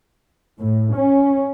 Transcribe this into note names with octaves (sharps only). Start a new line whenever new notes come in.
A2
C#4